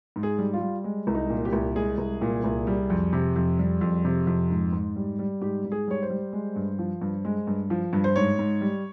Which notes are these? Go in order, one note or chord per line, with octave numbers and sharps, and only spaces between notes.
G#2
G#4
G3
F4
G3
G#3
C2
D#4
A#2
G4
C2
G#3 G#4
C2
A#2
C2
G3
F2
C3
F2
G3
F2
C3
F2
G#2
G#2
G3
G3
G#2 G4
G#2
G#4
G3 C#5
C5
G3
G#3
G2
F3
G2
G#3
G2
F3
G2
C5
G#2 C#5
G#2
G3